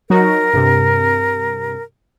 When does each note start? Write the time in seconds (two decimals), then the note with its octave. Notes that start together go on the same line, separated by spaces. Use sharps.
0.10 F#3 D#4 F#4 A#4
0.53 G2 C3